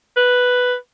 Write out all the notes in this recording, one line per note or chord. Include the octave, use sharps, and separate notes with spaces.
B4